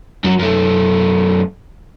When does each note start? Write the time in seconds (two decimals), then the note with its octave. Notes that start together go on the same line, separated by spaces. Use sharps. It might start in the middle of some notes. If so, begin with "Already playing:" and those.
0.24 F#2 F#3
0.39 F#2 A3